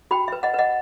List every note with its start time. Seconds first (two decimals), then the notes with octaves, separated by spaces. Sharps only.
0.11 F#4 G5 B5
0.28 B4 E5
0.43 D#5 F#5
0.54 B4 D#5 F#5